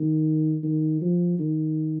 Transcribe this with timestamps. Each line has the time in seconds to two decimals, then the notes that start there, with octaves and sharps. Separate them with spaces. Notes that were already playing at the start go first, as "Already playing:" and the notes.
Already playing: D#3
0.64 D#3
1.01 F3
1.39 D#3